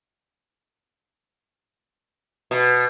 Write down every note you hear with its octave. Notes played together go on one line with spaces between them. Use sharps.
B2